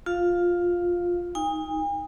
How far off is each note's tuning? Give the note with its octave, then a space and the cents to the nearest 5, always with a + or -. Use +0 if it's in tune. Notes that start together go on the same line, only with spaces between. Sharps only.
F4 +10 F5 +0
D#4 +15 G#5 -45